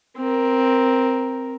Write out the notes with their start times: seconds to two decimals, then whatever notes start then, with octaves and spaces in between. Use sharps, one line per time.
0.17 C4 A#4